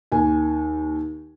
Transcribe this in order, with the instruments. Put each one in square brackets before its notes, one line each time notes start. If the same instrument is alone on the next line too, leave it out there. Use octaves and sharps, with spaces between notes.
[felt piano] D#2 G#5